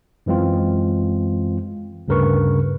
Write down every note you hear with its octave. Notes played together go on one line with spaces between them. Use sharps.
F#2 E3 G#3 C4 F4
D2 G2 C#3 A#4 B4 C#6